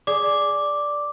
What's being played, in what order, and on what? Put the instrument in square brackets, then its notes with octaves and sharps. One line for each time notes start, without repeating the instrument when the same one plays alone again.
[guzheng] G#4 [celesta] D5 [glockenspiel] D6